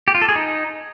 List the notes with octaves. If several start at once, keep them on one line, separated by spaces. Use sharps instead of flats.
G4
F4
A4
G#4
D#4